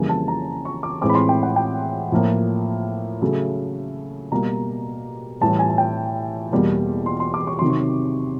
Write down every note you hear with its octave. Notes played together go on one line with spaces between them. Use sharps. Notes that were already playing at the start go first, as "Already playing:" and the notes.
Already playing: F2 C#3 E3 G3 A#3 G#5
A5
A#5
C#6
D6
A2 E3 G#3 C4 D6
B5
C6
G5
F#5
G5
A2 F3 A#3
C#3 F#3 A3
B2 G3 A#3 A#5
A2 E3 G3 A5
G#5
G#5
G5
E2 B2 G3 A#3
C6
C6
D6
C#6
C3 D#3 F#3 C6
C#6